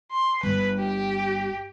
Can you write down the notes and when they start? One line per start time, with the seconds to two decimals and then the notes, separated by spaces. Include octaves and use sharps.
0.11 C6
0.43 G1 B4
0.79 G4